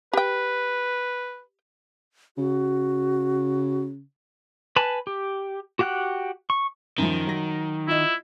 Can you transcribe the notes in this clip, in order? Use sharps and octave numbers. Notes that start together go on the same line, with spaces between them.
G4 B4 G5
C#3 F#4
B4 G#5 A5 B5
G4
F#4 G4 F#5 G5 F#6
C#6
F#2 D#3 F3
F#3 A#6
E4 F4 D#5